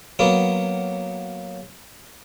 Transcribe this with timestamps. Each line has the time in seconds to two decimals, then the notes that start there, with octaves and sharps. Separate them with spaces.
0.19 F#3 A#3 B3